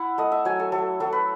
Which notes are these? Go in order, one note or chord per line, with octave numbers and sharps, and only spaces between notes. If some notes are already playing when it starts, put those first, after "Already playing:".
Already playing: E4 F#5
A3 D#5
E5
F#3 G#5
A4
F#3 A4
F#3 A4
B4